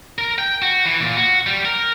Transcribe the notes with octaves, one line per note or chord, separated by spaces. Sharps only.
A#4
G5
F#4
E3
A#2
F#4
G3
A#4